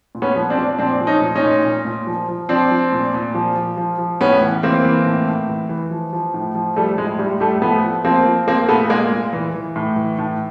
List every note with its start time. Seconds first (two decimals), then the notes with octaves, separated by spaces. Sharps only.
0.15 A#2
0.22 B3 C#4
0.36 F3
0.50 C4 D4
0.58 F3
0.78 A#2 C4 D4
1.01 F3
1.07 C#4 D#4
1.21 A#2
1.35 C#4 D#4
1.43 A#2
1.64 A#2
1.85 A#2
2.07 F3
2.28 F3
2.49 F3 C4 D4
2.71 F3
2.92 A#2
3.14 A#2
3.34 F3
3.56 F3
3.77 F3
3.98 F3
4.21 A2 B3 C#4
4.41 E3
4.63 E3 A#3 C4
4.84 E3
5.06 A2
5.27 A2
5.49 E3
5.69 E3
5.91 F3
6.13 F3
6.34 A2
6.55 F3
6.76 F3 G3 A3
6.98 A2 G#3
7.19 A2 G3
7.40 A2 G3 A3
7.62 F3 A3 B3
7.84 F3
8.04 F3 A#3 C4
8.25 F3
8.47 F3 A#3 C4
8.68 A#2 A3 B3
8.90 A#2 G#3 A#3
9.12 A#2
9.33 E3
9.54 E3
9.76 A2
9.96 E3
10.18 A2